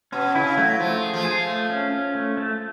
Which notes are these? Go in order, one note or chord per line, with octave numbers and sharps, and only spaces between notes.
B2 C#4
C#3 E4
F#3 A3
F3 A3
G#4
F3
G#4
A3
C#4
C#4
A3
A3